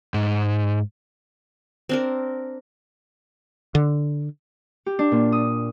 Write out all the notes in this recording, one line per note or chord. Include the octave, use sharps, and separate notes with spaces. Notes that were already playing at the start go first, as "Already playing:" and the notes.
G#2
C4 D4 A#4
D3
G4
D4
A#2
D#6